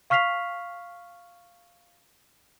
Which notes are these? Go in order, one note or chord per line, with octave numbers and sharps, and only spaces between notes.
F5 C#6 F6 B6 C7 F7